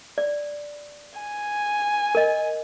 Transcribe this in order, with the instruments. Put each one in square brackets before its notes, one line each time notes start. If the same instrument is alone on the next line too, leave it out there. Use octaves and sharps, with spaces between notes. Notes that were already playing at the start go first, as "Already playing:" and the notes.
[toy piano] D5
[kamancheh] G#5
[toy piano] A#4 D#5